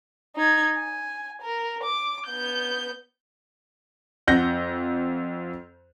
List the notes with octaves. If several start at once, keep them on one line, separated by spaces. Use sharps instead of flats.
D#4 G#6
G#5
A#4
D6
B3 G6
F2 F#5 G6 A#6